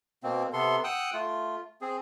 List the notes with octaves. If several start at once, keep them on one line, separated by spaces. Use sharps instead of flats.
B2 A#3 C4
C3 B3 A4 C6
F#5 G5 D#6 E6 F#6
A3 F4
C4 G#4